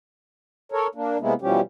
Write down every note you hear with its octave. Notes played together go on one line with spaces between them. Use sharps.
A4 A#4 C#5
A#3 D4
C3 G#3 A#3 B3 E4
B2 E3 F3 G3 C#4 G4